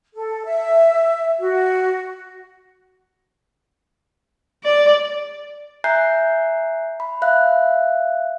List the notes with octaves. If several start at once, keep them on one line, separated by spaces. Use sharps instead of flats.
A4
E5
F#4
D5
E5 G#5 A#5 F#6 G6 C7
B5
E5 F5 F#6